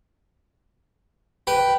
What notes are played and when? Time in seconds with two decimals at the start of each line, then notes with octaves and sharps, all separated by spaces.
1.47 B4 G5